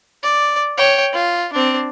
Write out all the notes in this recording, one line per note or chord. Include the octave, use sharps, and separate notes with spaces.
D5
C#5 G5
F4
C4 D4